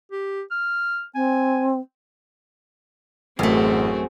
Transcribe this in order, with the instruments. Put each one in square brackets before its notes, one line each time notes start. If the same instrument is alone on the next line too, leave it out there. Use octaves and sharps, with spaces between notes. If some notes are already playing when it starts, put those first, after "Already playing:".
[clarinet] G4
F6
[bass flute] C4 [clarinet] G#5
[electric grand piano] A1 [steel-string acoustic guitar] F#2 A3 [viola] C4 F#4 [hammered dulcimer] G#4